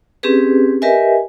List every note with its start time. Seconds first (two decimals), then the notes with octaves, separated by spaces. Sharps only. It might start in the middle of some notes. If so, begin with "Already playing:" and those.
0.23 C4 C#4 G4 G#4 B4
0.82 G4 A#4 B4 D#5 E5 G#5